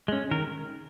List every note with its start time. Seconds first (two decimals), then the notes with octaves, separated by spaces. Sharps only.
0.08 G#3 C#4
0.31 D#3 A#4